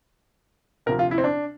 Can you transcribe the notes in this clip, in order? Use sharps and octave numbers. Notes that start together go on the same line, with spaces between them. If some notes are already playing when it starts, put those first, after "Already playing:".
D2 C3 F3 A#4
F4
E4
C4
D4